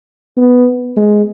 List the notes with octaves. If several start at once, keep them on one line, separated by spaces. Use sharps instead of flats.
B3
G#3